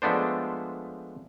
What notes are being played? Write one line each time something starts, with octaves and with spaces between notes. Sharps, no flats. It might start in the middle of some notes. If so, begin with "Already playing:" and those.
F3 G#3 A3 B3 D4 C5